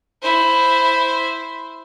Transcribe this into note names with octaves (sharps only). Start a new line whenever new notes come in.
E4 C5